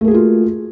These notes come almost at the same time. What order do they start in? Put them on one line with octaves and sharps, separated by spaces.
A3 A#3 G#4 F#4 F4